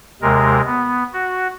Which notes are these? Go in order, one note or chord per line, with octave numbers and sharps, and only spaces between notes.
D#2 C3 G#3 A#4
B3
F#4